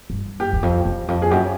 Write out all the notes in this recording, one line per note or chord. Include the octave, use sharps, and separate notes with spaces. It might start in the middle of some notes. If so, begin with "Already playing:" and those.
G2
G4
E2
F2
E2
F2
G#4
F#2 G4